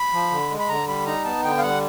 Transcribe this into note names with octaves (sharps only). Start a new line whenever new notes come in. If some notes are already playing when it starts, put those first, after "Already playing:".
Already playing: B5
F3
D3
G#3
B5
D3 A#5
G3 B5
D#4 A#5
B3 A5
D3 G5
F5
G3 F#5